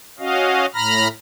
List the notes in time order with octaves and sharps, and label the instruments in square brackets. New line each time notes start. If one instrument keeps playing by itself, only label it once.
[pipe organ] C#4 F#4 D#5 F5
A2 A#5 B5 F6 A#6